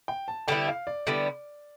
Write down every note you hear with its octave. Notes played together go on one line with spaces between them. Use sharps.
G5
A5
D3 G3 B3 E4 G5
F5
D5
D3 G3 B3 E4